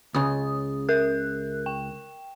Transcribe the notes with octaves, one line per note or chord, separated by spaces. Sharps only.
C#2 C#3 D#6
A#4 F#6
G5